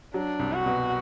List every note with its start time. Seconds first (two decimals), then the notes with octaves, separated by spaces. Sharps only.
0.14 F#3 D4
0.39 C2
0.53 F#4
0.66 B2